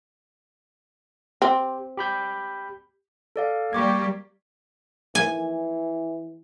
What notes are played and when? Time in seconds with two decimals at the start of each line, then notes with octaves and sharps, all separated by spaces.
1.42 C4 G4
1.97 G4 B5 G6
3.36 A4 D5 F5
3.73 G3 A#3 G4 C#6 D6 G#6
5.15 E3 G#5